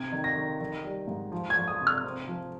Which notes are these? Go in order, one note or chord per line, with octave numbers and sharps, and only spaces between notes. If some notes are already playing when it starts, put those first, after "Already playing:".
Already playing: C3 G#6
D#3
A#6
D#3
D#3
G3
G#2
F3
G#6
F3
D#6
C3
F6
C4
F3